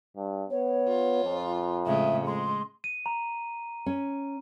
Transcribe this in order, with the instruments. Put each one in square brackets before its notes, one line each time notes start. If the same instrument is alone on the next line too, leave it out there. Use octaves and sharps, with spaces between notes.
[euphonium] G2
[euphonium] B3 [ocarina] C#5
[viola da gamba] F4
[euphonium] F2
[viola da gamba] A2 C#3 G#3 [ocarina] E5
[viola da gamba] G#3 [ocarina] C6
[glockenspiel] D#7
A#5
[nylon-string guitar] C#4